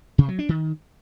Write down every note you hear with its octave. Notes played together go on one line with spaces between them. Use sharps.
C3
F#3
D4
D#3